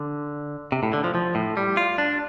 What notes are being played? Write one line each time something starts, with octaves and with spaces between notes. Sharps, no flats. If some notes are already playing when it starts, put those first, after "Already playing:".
Already playing: D3
C3
A2
D3
F3
F3
A2
G3
F4
D4